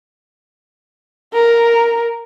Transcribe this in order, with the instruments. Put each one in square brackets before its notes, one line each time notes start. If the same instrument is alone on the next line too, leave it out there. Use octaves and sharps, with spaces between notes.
[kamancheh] A#4